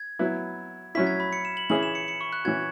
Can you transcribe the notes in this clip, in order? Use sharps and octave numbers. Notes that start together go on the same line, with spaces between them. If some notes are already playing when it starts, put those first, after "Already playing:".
Already playing: G#6
F#3 B3 E4
F#3 C#4 E4 B6
G#6
B5
C#7
E7
F#7
E3 C#4 E4 G#4 F#7
E7
C#7
C#7
C#6
F#6
E3 C#4 F#4 G#6